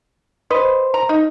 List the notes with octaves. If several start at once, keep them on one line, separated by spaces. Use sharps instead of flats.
B4 C5 D#5 C6
A#5
D#4